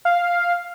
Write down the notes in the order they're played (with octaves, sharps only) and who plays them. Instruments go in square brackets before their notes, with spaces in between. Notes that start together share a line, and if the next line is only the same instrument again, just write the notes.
[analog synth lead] F5